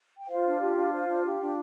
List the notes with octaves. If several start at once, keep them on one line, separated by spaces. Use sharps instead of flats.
G5
F4 C5 F5
D4
G4
D4
C5
D4
G4
D4